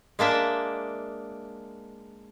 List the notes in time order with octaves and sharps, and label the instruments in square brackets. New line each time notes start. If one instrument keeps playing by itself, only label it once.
[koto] G#3 A#3 D4 E5